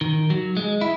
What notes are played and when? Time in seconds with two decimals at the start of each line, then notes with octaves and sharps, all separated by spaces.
0.01 D#3
0.30 F#3
0.57 G#3
0.81 E4